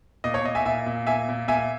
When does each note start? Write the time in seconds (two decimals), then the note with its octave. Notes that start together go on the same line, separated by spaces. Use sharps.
0.24 A#2 D#5
0.34 C#5
0.44 A#2 D#5
0.55 E5 G#5
0.65 A#2 E5 G#5
0.86 A#2
1.07 A#2 E5 G#5
1.29 A#2
1.48 A#2 E5 G#5